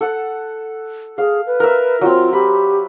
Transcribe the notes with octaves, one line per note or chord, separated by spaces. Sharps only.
A4 F#5
G#4 F5
B4
A#4 E5
F#3 C4 F4
G4 B5